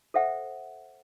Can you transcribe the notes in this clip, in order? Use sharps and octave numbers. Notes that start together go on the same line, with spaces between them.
A4 C5 E5 F#5